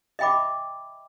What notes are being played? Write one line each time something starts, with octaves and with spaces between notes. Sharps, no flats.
D#5 E5 G5 B5 D6